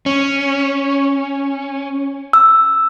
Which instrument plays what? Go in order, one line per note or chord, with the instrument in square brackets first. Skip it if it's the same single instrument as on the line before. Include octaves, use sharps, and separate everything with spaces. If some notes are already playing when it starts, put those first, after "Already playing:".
[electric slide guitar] C#4
[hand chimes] E6